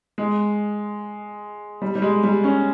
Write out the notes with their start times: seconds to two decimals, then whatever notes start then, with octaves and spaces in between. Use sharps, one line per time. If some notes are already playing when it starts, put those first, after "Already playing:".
0.18 G#3
1.82 G3
1.95 G3
2.02 G#3
2.24 G3
2.44 C#4